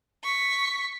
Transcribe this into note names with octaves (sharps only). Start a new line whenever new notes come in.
C#6 B6